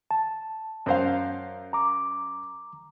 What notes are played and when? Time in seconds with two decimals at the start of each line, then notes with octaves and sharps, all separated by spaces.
0.11 A5
0.86 F#2 C5 F5
1.73 A#5 D6